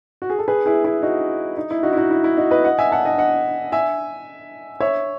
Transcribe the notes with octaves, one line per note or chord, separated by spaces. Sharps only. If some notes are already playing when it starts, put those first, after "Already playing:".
F#4
G#4
A4
G#4 B4
E4 G#4
E4 G#4
D#4 F#4
D#4
E4
D#4 F#4
E4
D#4 F#4
E4
E4
D#4 F#4
B4 D#5
D#5 F#5
E5 G#5
F#5 A5
D#5 F#5
D#5 F#5
E5 G#5
C#5 E5